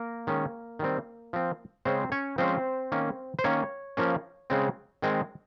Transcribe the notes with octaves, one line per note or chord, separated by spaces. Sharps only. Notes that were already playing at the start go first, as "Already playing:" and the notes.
Already playing: A#3 A#4
D#3 G#3 C#4
D#3 G3 C4
F3 C4
C#3 G#3 C4 C#4 C5
C#4 C#5
F3 G#3 C4 C#4 C5
D#3 A#3 C#4
C5
D#3 A#3 C#4 C#5
F3 A#3 C#4
C#3 G#3 C4
D#3 G#3 C4